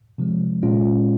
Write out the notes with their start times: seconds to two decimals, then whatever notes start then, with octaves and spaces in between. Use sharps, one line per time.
0.18 C3 F3 G#3
0.63 A#2 G#3 C#4 F4